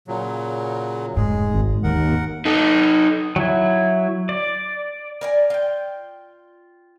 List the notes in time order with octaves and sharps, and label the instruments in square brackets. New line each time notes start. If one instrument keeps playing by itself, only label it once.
[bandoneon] A#2 C#3 F#3
[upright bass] F1 G#2 [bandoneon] G#3 G#4
[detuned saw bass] G#1
[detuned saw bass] D#2 [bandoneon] A#4 F#5
[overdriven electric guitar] D#4 A4
[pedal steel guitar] F#3 E4
D5
[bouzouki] A#4 D5 G#5
F4 G5